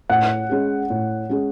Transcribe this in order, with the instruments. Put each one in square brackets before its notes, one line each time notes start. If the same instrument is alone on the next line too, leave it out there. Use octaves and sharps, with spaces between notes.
[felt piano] A2 [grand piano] F#5
[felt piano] G#3 C#4 G#4
A2
G#3 C#4 G#4